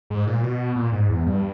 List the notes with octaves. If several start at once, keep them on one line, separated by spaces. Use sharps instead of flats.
G#2
A#2
B2
A#2
G#2
E2
G2